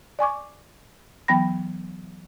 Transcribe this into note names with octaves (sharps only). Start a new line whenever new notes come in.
D5 G#5 C#6 D6
E3 F#3 B3 G5 B5 A#6